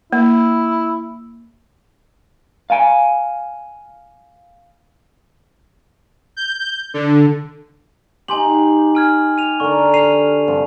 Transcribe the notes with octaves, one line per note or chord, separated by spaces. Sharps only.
A#3 E4
F5 G#5
G6
D3
D#4 G4 G#5 C6 F#7
G#5 F6 G#6
D#7 F7
D3 A#4 C#6
C7 D#7 F7
G2 C3 F3